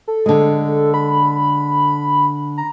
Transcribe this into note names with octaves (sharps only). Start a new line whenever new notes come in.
A4
D3 G#3
B5
A#5